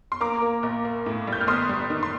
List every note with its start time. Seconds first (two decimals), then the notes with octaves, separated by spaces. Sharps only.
0.12 C6
0.20 A#3 A#5 D6
0.42 A#3
0.63 A#1
0.85 A#3
1.06 A2
1.27 G3
1.33 G6
1.41 F6
1.47 G1 C6 D#6
1.69 G3
1.90 D#3
2.03 C6